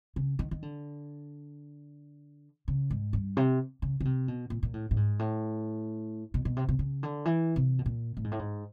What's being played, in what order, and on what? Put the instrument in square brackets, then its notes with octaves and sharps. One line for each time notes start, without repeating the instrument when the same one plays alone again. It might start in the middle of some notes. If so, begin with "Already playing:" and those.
[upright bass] C#3
D#3
D#3
D3
C#3
G#2
G2
C3
C#3
C#3
C3
B2
A#2
A#2
A2
A2
G#2
A2
B2
B2
C3
C3
C#3
D3
E3
C3
B2
A#2
A2
G#2
A2
G#2